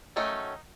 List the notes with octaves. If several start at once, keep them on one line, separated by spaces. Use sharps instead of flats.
D#3 F#3 A3 C#4 D#4